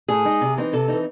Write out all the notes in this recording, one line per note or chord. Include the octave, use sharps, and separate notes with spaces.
A2 G#4
G#3 D#4
C3
E3 C4 D#4
C3 A4
E3 C4 D#4